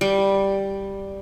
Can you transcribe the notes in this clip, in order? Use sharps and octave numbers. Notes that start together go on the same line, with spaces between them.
G3